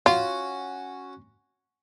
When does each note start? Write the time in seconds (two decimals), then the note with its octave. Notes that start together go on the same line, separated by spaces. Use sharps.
0.06 C#4 F4 F#4